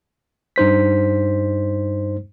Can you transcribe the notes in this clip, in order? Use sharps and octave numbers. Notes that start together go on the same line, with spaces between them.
G2 D#4 C5 B6